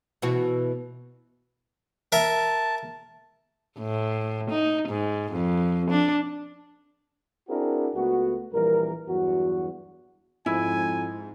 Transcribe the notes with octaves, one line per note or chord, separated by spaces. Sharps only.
B2 E3 F#4
A#4 E5 A5
A2
D#4
G#2
F2
D4
C4 D4 E4 F#4 G#4 A#4
C#2 A3 B3 F#4
A#1 E3 G3 A#4
E2 G2 F#3 F#4
F2 G#2 E4 G#5